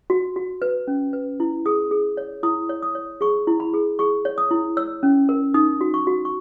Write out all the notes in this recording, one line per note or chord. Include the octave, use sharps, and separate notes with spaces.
F#4
F#4
B4
C#4
B4
E4
G#4 D#6
G#4
C#5
E4 D#6
C#5
D#6
C#5
G#4 C#6
E4
B5
G#4
G#4 C#6
C#5
D#6
E4
C#5 E6
C#4
A#4
D#4 D#6
F#4
C#6
F#4
C#6